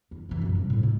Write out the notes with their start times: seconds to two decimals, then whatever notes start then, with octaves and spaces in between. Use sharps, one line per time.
0.11 E2
0.29 G2 E3
0.41 F#2 B2
0.55 C3 G3
0.70 A2 C3
0.83 G#3